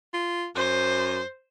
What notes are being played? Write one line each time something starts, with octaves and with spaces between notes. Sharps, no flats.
F4
F#2 C5